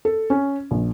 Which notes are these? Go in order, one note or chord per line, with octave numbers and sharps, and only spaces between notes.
A4
C#4
A#1